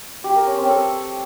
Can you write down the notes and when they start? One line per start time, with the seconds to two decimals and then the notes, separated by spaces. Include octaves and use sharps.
0.24 G4
0.35 A#4
0.47 C#4
0.58 C4
0.69 A4